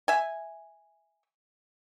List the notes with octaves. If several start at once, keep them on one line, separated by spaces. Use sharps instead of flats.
E5 G#5